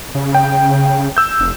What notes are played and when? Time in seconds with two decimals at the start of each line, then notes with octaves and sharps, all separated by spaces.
0.15 C#3
0.35 G5
1.17 E6 G6
1.40 F1